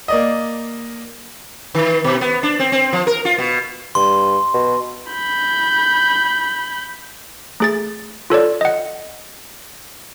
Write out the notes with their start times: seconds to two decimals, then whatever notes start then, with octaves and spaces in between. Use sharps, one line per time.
0.08 A#3 D5 D#5
1.75 D#3
2.04 B2
2.21 B3
2.43 D4
2.60 C4
2.72 C4
2.93 F3
3.07 A#4
3.25 F4
3.38 B2
3.95 G2 C6
4.54 B2
5.11 B5 G6
7.60 A3 G#4 A6
8.30 F4 A4 C#5 D5
8.61 D#5 F#5